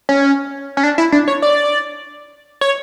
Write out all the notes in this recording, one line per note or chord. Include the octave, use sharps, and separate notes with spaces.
C#4
C#4
D4
E4
D4
C#5
D5
C#5